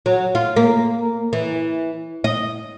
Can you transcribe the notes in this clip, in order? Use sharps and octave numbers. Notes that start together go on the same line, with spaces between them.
F#3
F4
A#3
E3
D#5